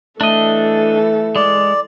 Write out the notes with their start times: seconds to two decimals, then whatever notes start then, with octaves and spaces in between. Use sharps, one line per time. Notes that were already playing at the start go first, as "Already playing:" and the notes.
0.21 E3 A3 D4 A4 D#5
1.36 G#3 D5